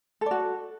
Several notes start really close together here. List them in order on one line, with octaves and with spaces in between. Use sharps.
A4 D5 F#4